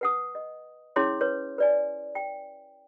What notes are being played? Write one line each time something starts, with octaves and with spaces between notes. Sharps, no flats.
B4 F#5 D#6
D#5
C#4 E4 G#4 C#5 C6 D6
B4 C#5
B4 D5 G#5
G5